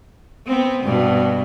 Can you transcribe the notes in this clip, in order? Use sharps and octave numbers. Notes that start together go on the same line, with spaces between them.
B3 C4
G2 B2